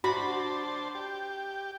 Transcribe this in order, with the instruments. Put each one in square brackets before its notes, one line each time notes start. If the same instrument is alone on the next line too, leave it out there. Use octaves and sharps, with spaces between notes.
[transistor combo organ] D4 C5 A5 [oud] F#4 [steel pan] B5
[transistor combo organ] G4